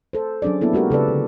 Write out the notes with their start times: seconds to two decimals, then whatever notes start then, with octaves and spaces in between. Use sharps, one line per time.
0.13 A4 C5
0.42 F#3 C#4 D4 G#4 D5
0.61 A#3 B3 E4 A4
0.73 G#3 F#4 G4 A#4
0.90 C#3 A4 B4 D5
1.08 D3